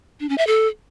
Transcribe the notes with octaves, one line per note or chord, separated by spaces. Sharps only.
D4
C#4
E5
A4